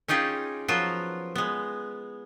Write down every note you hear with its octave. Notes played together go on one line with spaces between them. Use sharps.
C#4 D#4 F4 G4 G#4
F3 F#3 B3 F4 A#4
G#3 B3